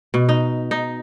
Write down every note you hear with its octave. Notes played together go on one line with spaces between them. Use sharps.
B2
D#4
D#4